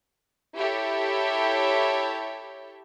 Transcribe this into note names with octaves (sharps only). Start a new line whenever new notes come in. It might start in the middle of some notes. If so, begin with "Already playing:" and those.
E4 G4 A4 C#5 E5